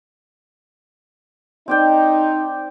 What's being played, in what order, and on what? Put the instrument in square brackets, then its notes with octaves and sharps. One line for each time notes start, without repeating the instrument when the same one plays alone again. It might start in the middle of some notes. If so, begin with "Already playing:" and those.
[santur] C4 D5 G5 [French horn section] D#4